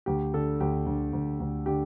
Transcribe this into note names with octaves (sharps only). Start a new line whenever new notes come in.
D2 G4
D3 A4
D2 G4
D2
D2
D2
D3 G4